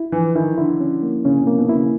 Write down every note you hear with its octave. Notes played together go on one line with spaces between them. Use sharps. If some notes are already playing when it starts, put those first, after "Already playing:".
Already playing: E4
E3 F3
D#3 E4
D3 E4
C#4
A#3
C#3 C#4
C3
A#3
B2
E4
C#3